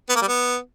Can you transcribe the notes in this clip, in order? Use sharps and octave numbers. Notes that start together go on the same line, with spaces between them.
B3
A#3
G3
B3